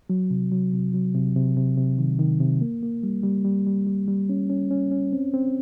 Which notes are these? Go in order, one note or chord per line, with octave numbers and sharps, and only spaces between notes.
F#3
C3
F#3
C3
F#3
C3
C3
C3
C3
D#3
D#3
C3
A#3
A#3
G3
G3
G3
G3
G3
G3
C#4
C#4
C#4
C#4
C4
C4